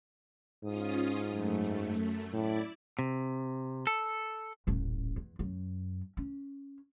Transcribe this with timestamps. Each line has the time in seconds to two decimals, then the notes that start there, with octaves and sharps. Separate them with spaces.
0.64 G#2 C#4 F4 D#6
1.27 F#2 A3
2.33 A2 E4 D5
2.99 C3
3.87 A4
4.67 D#1 A1
5.16 E2
5.39 F#2
6.17 C#4